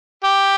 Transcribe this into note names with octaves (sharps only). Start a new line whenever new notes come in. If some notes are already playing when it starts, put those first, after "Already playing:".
G4